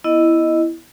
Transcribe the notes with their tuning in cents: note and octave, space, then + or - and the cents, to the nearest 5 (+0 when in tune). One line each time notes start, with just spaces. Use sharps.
B3 +0 E4 +0 D#5 +0